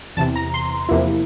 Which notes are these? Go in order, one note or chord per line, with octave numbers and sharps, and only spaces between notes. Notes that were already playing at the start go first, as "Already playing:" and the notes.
E2 C3 E3 A5
A#5
C6
E2 C3 F3 A#3 E4